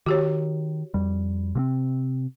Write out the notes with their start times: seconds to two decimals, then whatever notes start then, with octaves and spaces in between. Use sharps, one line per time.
0.06 D#3 F#4 G4 C#5
0.94 F2 G3
1.55 C3 A#3 C4